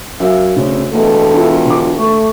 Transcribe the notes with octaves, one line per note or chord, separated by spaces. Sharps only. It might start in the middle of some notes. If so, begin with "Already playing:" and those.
F#2 E5 F5
D2 C#3 C4
E1 A3 B3 A4 D#5
D4 E4 F4
D3 D6
A3 C#6